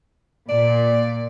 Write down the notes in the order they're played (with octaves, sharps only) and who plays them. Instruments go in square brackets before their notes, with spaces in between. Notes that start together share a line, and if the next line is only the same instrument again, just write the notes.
[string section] A#2 [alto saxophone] D5